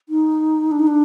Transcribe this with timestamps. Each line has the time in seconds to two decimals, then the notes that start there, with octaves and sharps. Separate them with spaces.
0.09 D#4
0.71 D4
0.79 D#4
0.87 D4